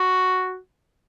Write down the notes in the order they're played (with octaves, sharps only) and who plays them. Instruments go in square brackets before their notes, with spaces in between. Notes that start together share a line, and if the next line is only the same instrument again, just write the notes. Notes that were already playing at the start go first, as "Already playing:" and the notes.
Already playing: [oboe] F#4